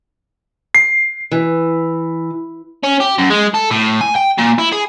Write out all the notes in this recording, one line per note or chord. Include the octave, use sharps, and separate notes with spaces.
C7
E3
C#4
G4
F#2
G#3
A4
A2
G#5
G5
A#2
E4
G#4